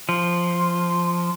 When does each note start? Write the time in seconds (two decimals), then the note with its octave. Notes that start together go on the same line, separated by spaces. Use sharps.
0.09 F3 C6